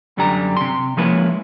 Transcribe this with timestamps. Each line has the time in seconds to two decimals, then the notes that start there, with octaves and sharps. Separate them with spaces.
0.18 F#2 D3 G3 G4 A#5
0.57 C3 C6
0.97 F3 G#3 A#3 C#4 E4 B4